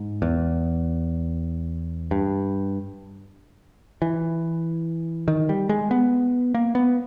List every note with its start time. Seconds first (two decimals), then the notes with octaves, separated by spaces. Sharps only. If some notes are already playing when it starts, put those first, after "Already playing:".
Already playing: G#2
0.22 E2
2.11 G2
4.02 E3
5.28 D#3
5.49 G3
5.69 G#3
5.91 B3
6.54 A#3
6.75 B3